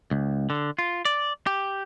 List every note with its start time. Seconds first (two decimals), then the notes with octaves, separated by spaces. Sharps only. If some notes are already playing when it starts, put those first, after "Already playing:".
0.11 C#2
0.50 D3
0.79 F4
1.05 D5
1.47 G4